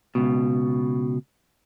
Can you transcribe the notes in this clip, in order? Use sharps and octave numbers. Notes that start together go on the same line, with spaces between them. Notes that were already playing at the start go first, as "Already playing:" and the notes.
C#2 B2